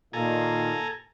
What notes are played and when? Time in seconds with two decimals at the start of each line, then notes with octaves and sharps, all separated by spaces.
0.13 A#2 D#3 A4 F5 G#5 A#5